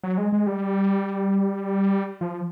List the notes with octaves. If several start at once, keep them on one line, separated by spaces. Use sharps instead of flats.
F#3
G#3
G#3
G3
F3